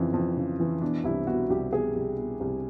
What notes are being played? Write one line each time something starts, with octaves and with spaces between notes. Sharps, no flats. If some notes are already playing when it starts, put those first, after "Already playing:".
Already playing: F2 C#3 E3
F2
C#3
E3
B2 D4
C2 E4
B2 F#4
C2 G4
B2 G#4
C2
B2
C2